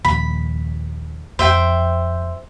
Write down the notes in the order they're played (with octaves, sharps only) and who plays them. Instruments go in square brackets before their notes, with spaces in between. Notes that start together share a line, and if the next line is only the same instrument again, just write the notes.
[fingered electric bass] D#2 A#2 F3 [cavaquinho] B5
[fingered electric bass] F2 F3 [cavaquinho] C5 E5 G5